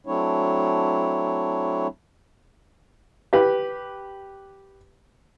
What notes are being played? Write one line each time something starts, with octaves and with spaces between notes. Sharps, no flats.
F#3 A3 C4 D4 E4 C#5
G4 B4